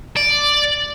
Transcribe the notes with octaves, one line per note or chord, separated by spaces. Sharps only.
D5